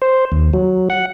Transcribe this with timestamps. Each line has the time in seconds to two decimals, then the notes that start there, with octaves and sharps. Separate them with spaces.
0.02 C5
0.32 D#2
0.53 F#3
0.90 F#5